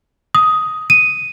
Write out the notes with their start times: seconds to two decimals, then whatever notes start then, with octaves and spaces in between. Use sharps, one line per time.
0.35 D#6
0.90 D#7